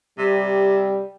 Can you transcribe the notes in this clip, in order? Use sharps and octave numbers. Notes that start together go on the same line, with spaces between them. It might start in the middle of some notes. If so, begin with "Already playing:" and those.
C3 G3